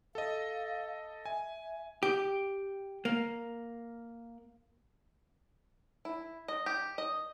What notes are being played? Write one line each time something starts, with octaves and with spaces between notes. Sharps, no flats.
A4 D#5 F5
E5 G#5
G4
A#3
E4
D#5
G4
D#5